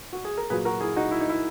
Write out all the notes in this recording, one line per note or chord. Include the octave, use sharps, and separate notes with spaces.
F#4
G#4
A#4
A#2 F#3 A#3 G#4 B4
F#4 A#4
E4 G#4
D#4 F#4
E4
D#4
E4